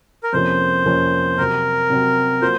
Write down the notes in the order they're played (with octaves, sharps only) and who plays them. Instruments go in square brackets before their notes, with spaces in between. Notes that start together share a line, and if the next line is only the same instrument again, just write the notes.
[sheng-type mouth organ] A#4
[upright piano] F2 C3 F3 A#3 C#4 [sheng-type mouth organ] C5
[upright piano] F2 C3 F3 A#3 C#4
[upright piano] C3 F#3 C4 [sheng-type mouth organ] A#4
[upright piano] C3 F#3 C4
[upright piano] F#3 A#3 F4 [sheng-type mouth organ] C5